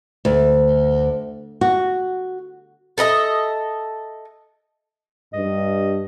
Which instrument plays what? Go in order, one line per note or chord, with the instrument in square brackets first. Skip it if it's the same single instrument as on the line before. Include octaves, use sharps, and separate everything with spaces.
[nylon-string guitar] D2
F#4
[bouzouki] A4 B4 D#5 E5
[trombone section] G2 [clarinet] D#5